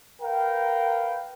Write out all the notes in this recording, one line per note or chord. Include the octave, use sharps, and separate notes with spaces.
A#4 B4 F5 G5